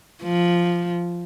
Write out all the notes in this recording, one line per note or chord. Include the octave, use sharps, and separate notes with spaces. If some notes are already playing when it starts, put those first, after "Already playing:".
F3